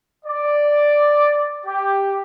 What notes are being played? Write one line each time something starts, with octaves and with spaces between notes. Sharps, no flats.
D5
G4